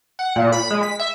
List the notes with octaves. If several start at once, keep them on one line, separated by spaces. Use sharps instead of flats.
F#5
A#2
B5
G#3
B6
E5